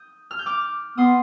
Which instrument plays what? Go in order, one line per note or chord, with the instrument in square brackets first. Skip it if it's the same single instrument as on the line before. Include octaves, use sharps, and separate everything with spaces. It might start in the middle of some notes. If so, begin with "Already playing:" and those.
Already playing: [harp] D#6 G6
F6
G6
D6 F6
[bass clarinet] B3 [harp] C6 D#6